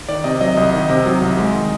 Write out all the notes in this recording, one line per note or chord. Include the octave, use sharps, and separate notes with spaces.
D#3 D5
C3 D#5
F#3 D#5
C2 D#5
D#3
C3
F#3
C2
G#3
D#3